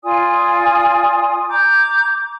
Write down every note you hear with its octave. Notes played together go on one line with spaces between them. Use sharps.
F4 D5 G#5 D#6
A#5 D6 G6